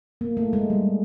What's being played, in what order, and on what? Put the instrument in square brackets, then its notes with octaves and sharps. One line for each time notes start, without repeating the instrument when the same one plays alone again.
[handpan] A#3
A3
G#3
G3